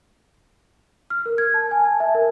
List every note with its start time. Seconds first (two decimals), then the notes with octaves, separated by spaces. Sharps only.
1.10 F6
1.26 A#4
1.38 G#6
1.54 A5
1.71 G#5
1.85 A5
2.00 E5
2.15 A#4